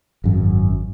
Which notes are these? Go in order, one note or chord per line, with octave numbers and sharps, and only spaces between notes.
G#1 F#2